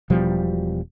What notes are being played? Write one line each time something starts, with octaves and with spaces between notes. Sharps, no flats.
E1 B2 F3 G3